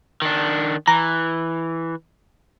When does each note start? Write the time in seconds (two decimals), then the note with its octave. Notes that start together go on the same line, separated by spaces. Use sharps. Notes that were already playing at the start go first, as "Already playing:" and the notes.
0.22 D#3 D4
0.87 E3 A#5